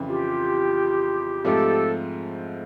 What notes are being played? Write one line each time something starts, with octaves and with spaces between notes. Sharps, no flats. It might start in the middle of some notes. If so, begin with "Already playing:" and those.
Already playing: F2 C#3 E3
F4 G4
G#2 F3 A3 C4 G4 A4